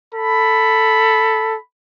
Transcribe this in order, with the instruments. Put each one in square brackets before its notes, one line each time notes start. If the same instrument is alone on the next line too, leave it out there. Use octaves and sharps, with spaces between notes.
[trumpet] A4 [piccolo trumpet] B5